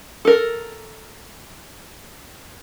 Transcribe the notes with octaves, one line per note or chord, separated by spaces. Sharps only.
A4 A#4